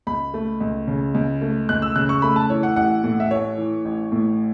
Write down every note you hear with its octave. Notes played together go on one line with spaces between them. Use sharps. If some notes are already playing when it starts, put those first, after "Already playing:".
C#2 B5
A3
C#2
C#3
C#2
A3
C#2 F#6
E6
C#3 F#6
C#6
A3 B5
A5
E3 C#5
F#5
A1 F#5
A2
E5
A3 C#5
E3
A1
A2